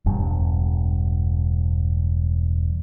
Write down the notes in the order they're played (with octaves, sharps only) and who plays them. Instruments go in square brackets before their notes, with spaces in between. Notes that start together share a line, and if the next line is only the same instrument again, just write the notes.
[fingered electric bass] E1 G2